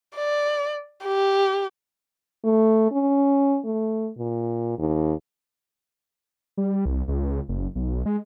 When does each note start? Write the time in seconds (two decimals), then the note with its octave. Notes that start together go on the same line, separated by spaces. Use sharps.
0.16 D5
1.05 G4
2.45 A3
2.92 C#4
3.65 A3
4.18 A#2
4.78 D#2
6.57 G3
6.86 C2
7.08 C#2
7.49 F#1
7.75 B1
8.06 G#3